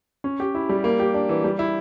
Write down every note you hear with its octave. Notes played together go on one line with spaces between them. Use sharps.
C#4
G4
E4
G3
A#3
G4
D4
E3
G3
E4